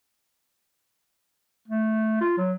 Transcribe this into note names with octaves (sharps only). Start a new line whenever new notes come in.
A3
F4
F#3